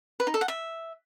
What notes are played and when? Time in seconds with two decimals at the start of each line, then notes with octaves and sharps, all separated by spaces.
0.20 B4
0.27 D#4
0.34 A4
0.41 F#5
0.48 E5